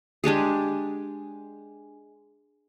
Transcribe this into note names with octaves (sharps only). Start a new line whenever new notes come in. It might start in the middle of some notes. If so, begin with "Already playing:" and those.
G#3 D4 G4 G#4